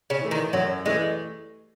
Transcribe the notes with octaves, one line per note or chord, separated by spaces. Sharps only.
C#3
E3 A3
D#3
F#2 F#3
E3 G#3 A3